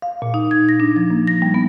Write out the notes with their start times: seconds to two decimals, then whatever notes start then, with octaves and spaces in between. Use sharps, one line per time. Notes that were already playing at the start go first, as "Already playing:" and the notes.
0.02 F5
0.22 A#2
0.34 D#4
0.51 G#6
0.69 A#6
0.80 D4
0.96 F3
1.10 A#3
1.27 A#6
1.42 G3
1.54 B3